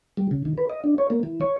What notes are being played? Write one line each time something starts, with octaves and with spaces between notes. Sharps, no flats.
G3
C#3
D#3
B4
D#5
D4
C#5
A#3
E3
C#5